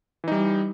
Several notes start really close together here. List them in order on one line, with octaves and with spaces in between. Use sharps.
E3 D#4 G3